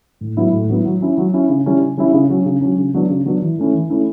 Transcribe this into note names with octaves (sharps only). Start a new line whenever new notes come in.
A2
F#3 B3 E4
A2
F#3 B3 E4
F#3
C#4 E4
F#3
C#4 E4
C#3
G3 C#4 E4
C#3
G3 C#4 E4
C#3
F#3 C#4
C#3
F#3 C#4
C#3
F#3 B3 D4
C#3
F#3 B3 D4
E3
A3 C#4 E4
E3
A3 C#4 E4